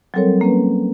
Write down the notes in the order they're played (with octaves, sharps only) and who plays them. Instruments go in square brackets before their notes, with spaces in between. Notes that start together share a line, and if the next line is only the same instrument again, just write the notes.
[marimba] F#3 G3 C4 A4 A#4 C#5
A#3 C#4 B4